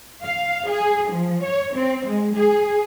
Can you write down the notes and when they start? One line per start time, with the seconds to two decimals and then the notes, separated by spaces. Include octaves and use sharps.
0.22 F5
0.68 G#4
1.11 F3
1.43 C#5
1.75 C4
2.06 G#3
2.36 G#4